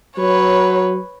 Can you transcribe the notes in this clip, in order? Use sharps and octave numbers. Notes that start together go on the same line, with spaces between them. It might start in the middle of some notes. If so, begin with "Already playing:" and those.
F#3 B4 C#5